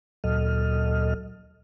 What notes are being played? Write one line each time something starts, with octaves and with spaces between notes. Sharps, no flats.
D2 A#2 F#3 A4 D#5 F6